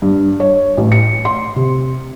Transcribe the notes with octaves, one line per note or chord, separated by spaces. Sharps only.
G2
C#5
A1
C#7
C6
C3